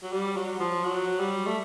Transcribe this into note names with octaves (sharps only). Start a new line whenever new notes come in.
F#3
G3
F#3
F3
F#3
G3
A3